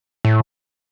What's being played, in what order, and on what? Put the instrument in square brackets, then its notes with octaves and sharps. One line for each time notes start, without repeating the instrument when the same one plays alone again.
[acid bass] A2